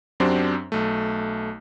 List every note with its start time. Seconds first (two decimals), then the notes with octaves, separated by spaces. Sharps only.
0.20 F#2 F#3 C4 D4 G4 C5
0.72 B1 A3